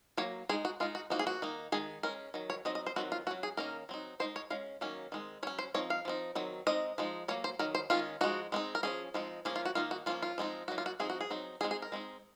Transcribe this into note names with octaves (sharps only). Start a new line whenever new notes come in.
F#3 A#3 C#5
G#3 D#4 G#4
F#4
G#3 D#4 F4
F#4
F3 A#3 D#4 F#4
G#4
F#4
D#3 A#3 D#4
D#3 G#3 D#4 G#4
G#3 C#4 A#4
D#3 F#3
C#5
F#3 C4 D#4 D#5
D#5
C5
D#3 F#3 C4 F#4
F4
F#3 C#4 F#4
G#4
D#3 A#3 C#4 A#4
F#3 C4 D#4
G#3 D#4 C5
C#5
G#3 C#4 F5
D#3 F#3 A#3 C#4
D#3 G#3 C4
F#3 C#4 C#5
C5
F3 C4 D#4 C#5
F5
F3 C4 D#4
D#3 F#3 C4
G#3 C4 D#4 D#5
F3 G#3 D#4
F#3 A#3 C#5
C5
D#3 F#3 A#4
C5
D#3 G#3 C#4 F4
F3 G#3 D#4 F#4
G#3 C4 D#4
A#4
F3 G#3 C#4 G#4
F3 G#3 C4 D#4
F3 A#3 C#4 G#4
F4
F#4
D#3 A#3 D#4 F4
F#4
F3 A#3 C#4 F4
F4
F3 G#3 C4 D#4
F#3 A#3 D#4 F#4
F4
F#4
F3 C4 D#4 G#4
F#4
G#4
F#3 C4 D#4
G#3 C4 D#4 G#4
G#4
A#4
G#3 C4 D#4